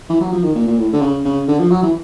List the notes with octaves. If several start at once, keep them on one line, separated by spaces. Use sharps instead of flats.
E3
F#3
F3
D#3
A#2
A#2
A2
D3
C#3
C#3
D3
F3
F#3
E3